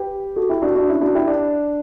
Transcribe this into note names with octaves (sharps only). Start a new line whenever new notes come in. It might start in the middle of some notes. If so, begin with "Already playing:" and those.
Already playing: G4 B4
F#4 A4
E4 G4
D4 F#4
D4 F#4
C#4 E4
D4 F#4
E4 G4
D4